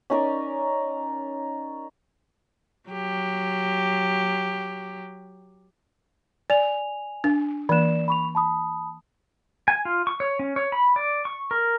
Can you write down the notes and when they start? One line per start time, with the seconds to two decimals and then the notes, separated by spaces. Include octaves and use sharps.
0.10 C#4 D#4 A#4 D5
2.89 F#3 G4
6.50 D5 G#5 F7
7.24 D4
7.69 E3 A#3 D5 E7
8.08 B5 C#6 F7
8.35 A5 B5 D#6
9.68 G#5
9.85 F4
10.07 C#6
10.20 C#5
10.39 C#4
10.56 C#5
10.72 B5
10.96 D5
11.25 C#6
11.51 A#4